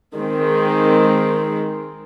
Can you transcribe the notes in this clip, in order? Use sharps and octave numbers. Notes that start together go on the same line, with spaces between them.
D#3 G#3 C4